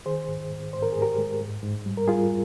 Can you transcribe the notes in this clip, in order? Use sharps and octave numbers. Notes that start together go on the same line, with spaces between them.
D#3 G#4 C5
G#2
G#2
G#2 C5
A#4
G#2 G#4
G4 A#4
G#3
G#2
G#2
G3
A#4
G3 F4 G#4